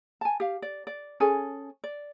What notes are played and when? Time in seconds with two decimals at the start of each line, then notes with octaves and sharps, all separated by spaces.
0.21 G#5 A5
0.40 G4 F5
0.62 D5
0.87 D5
1.20 C#4 G#4 A4 G#5
1.84 D5